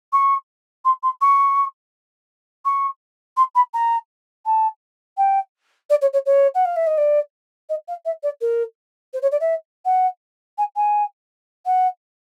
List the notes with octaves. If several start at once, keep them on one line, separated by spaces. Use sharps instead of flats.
C#6
C6
C6
C#6
C#6
C6
B5
A#5
A5
G5
D5
C#5
C#5
C#5
F#5
F5
E5
D#5
D5
D#5
F5
E5
D5
A#4
C5
C#5
D5
E5
F#5
G#5
G#5
F#5